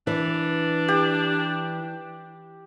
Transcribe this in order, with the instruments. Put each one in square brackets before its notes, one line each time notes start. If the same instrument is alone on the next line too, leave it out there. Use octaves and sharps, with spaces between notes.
[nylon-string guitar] E3 [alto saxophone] D4
[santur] G4